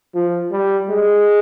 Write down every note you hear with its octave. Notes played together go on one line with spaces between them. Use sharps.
F3
G3
G#3